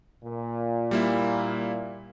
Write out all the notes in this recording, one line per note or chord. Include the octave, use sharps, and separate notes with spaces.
A#2
G3 A#3 E4